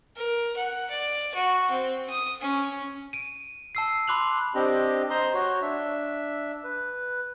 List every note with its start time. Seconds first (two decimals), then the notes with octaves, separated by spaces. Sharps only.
0.16 A#4
0.56 F#5
0.90 D5
1.35 F#4
1.71 C4
2.10 D#6
2.41 C#4
3.13 D7 D#7
3.75 A5 E6 C7
4.08 B5 C6 D6 F#6 F7 F#7
4.55 C4 D4 G4 D#5
5.10 C5 D#5 A#5 C6
5.34 F#4 C#5
5.62 D4 E5
6.64 B4